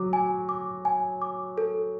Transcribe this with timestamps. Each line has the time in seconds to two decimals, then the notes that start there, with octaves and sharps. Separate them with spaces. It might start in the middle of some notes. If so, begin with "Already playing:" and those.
Already playing: F#3 D6
0.13 G#5
0.49 D6
0.85 G#5
1.22 D6
1.58 A4